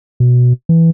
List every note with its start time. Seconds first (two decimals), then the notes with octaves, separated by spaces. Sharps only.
0.20 B2
0.69 E3